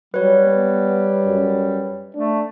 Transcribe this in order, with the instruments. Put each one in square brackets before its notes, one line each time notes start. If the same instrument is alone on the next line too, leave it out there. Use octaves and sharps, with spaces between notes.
[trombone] F#3 [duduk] G3 [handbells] B4 C#5
[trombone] B3
F#2
[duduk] A3 [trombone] D4